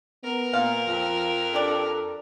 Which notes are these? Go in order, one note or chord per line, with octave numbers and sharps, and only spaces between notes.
B3 A#4
A#2 F5
F2 F3
D4 G4 A4 D5